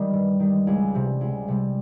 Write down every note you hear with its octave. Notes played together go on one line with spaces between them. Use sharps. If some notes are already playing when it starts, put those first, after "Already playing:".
Already playing: D#3 G3
G2
D#3 G3
C#2
C3 G3
C#2
C3 G3